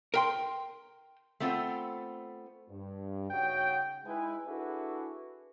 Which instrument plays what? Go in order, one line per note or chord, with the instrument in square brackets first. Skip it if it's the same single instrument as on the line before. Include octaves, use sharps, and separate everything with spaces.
[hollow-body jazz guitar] A#4 G5 C6
[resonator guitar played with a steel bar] A3 B3 C4 F4
[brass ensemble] G2
C#3 D#4 F#4 C#5 F#5 G5
G#3 D#4 E4 B4 G#5
D4 E4 F#4 G#4 A4 B4